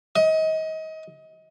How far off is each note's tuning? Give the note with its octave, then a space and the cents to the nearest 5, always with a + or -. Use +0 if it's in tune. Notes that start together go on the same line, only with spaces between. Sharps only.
D#5 +30